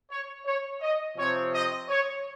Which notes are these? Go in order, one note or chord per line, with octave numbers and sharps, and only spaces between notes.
C#5
C#5
D#5
C3 F3 C4 C#5
D#5
C#5